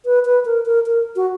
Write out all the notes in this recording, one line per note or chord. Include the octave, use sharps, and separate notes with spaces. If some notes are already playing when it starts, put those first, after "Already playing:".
B4
B4
A#4
A#4
A#4
F#4